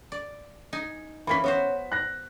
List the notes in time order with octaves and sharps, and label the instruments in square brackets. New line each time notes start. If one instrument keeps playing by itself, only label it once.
[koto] D5
D#4 G#5
[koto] E3 A#3 C#4 [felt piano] B5 B6
[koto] B3 F#4 C5 [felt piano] C#5
[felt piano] F#6 A#6